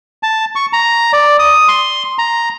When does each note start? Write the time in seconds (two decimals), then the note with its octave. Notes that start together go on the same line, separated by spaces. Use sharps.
0.23 A5
0.55 C#6
0.73 A#5
1.13 D5
1.39 D#6
1.68 C6
2.19 A#5